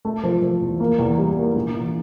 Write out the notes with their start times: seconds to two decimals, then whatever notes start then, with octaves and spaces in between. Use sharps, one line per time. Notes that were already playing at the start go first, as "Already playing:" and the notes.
0.05 A3
0.23 F3
0.42 F3
0.61 E2
0.80 A#3
0.99 E2
1.18 G3
1.36 A#3
1.55 A#1
1.74 E3